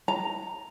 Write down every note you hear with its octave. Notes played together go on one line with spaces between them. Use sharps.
A#5